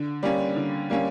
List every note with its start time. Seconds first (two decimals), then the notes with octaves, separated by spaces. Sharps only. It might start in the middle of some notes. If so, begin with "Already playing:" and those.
Already playing: D3
0.23 G3 A#3 C#4 D5
0.57 D3
0.90 G3 A#3 C#4